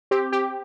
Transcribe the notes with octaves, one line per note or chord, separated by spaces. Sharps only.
C4 G4
G4